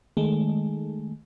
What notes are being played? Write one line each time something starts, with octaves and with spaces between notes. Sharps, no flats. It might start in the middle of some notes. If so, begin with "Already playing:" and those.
D#3 G#3 A3